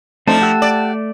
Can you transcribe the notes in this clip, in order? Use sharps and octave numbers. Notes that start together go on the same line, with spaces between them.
F3 A3 C4 D4 D#4 A5
G4 F#5 E6
D5